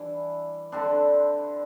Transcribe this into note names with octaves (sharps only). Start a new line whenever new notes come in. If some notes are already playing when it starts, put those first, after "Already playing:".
Already playing: E3 G3 D4 E4
D3 G3 C4 D4